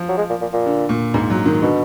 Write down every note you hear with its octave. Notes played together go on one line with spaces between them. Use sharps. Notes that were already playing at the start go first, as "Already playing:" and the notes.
Already playing: F3
F#3
G#3
A#2
A#2
A#2
D3
A#2
G#2
F#3
D#3
B2 D3